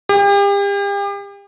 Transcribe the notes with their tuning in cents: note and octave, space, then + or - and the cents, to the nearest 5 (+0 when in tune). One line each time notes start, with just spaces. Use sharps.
G4 +40